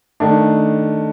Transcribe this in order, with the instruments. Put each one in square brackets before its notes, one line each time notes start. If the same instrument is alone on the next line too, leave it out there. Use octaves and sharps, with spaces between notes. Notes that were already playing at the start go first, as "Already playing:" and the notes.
[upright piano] D#3 A3 D4